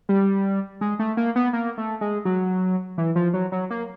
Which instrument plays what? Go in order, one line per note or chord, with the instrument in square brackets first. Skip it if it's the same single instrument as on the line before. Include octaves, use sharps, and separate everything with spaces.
[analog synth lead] G3
G#3
A3
A#3
B3
A#3
A3
G#3
F#3
E3
F3
F#3
F#3
A#3